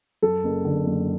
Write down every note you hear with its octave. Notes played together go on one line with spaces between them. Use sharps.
F#2 A4
F#1
D3
F#1